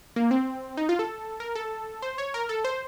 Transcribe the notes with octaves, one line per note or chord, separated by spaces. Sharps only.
A#3
C4
D#4
F4
A4
A#4
A4
C5
C#5
A#4
A4
C5